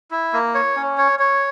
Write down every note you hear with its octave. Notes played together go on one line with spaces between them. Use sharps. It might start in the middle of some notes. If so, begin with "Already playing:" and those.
E4
A#3
C#5
C#4
C#5
C#5